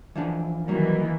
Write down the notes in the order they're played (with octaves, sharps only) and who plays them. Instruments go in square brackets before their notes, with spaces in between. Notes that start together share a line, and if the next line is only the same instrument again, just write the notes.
[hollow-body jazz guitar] E3 F3 D4
[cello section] D#3 E3 A#3 [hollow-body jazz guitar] F#3 G3